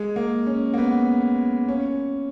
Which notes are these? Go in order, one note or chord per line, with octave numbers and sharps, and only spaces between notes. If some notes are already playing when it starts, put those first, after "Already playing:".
Already playing: G#3
A#3
C#4
A#3
B3
C#4